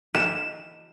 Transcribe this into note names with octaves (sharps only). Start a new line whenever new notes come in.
E7